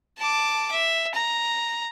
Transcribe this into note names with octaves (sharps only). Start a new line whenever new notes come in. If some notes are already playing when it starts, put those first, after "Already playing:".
A5 D6
E5
A#5